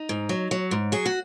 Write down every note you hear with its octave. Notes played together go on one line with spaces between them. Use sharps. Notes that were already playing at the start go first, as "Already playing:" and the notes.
Already playing: D#4
G#2
F#3
F#3
G#2
F#3 G#4
F#4